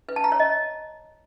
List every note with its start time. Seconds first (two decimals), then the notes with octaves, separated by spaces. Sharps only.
0.09 B4
0.16 A5
0.24 A#5
0.32 C#5
0.40 D#5